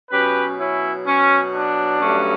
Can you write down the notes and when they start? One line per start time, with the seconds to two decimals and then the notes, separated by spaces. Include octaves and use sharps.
0.11 B2 F#3 C#4 G4 B4
0.59 C#4 E4
1.06 C#4
1.54 D4
2.00 G2 F#3 A3 C#4